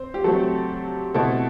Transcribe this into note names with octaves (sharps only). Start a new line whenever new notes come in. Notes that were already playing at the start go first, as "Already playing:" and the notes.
Already playing: C4 C5
G4
F#3 A3 C4 A4
B2 A3 C4 E4 A4